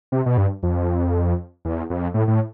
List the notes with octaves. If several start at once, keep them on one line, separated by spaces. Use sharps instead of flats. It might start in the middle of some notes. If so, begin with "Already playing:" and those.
C3
B2
G2
F2
E2
F2
A2
A2